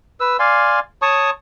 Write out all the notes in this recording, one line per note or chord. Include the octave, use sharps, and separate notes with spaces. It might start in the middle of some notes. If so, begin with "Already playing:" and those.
B4 E6
D5 F5 G#5 C6
C#5 A5 C#6 D#6